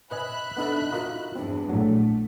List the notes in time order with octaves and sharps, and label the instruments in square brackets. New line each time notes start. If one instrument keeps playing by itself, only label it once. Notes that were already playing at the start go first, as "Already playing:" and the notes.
[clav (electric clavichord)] B4 D#5 G#5 [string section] E5 B5 F#6
[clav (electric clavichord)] B3 D#4 A4 [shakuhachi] D4
[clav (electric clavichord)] D#4 F4 A#4 [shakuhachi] F#4
[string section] E2 G2 [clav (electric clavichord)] C4 [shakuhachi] D4
[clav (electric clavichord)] A#1 A2 F#3 [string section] A3